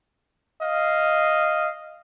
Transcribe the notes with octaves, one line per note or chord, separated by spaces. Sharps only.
D#5 F5